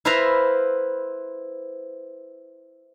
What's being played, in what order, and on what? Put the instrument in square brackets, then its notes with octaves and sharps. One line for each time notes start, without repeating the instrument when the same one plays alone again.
[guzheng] E4 B4 C5 E5 F5 A#5